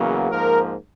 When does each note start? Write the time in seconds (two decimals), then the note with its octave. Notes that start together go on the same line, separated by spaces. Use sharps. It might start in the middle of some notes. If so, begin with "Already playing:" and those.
Already playing: E2 C#3 F#3 A#3
0.30 G#2 F3 A#3 A#4